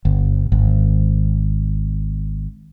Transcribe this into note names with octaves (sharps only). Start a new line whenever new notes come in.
G1
G#1